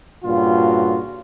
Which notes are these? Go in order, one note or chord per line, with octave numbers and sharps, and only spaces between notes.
G2 A#2 C#3 F4 F#4